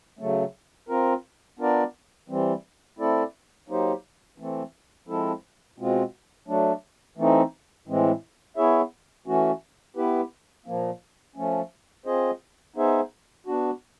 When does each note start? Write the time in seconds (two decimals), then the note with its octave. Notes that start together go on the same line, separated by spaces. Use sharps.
0.19 C#3 F#3 A3
0.89 C4 F4 A#4
1.59 B3 D4 F4 A#4 D5
2.29 E3 G3 C4
2.99 A3 C4 E4 A4 D5
3.68 F#3 A#3 D#4 G4 C5
4.38 E3 A3 C4
5.07 F3 G#3 C4 E4 A4
5.78 B2 G#3 C4 F4
6.48 F#3 A3 D4
7.17 E3 A3 C4 D#4
7.88 A2 E3 G#3 C4
8.57 B3 E4 G#4 C#5 E5
9.27 E3 A3 C#4 F#4
9.96 B3 E4 G4 B4
10.66 A#2 F3 A#3
11.36 F3 A3 C#4
12.06 C4 F4 G#4 C5 D#5
12.76 B3 D#4 G#4 C5 E5
13.46 B3 D4 F#4